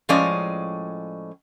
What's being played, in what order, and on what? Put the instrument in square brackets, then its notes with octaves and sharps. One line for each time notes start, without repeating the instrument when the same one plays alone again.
[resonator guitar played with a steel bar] A2 F3 G#3 C#4 D5 D#5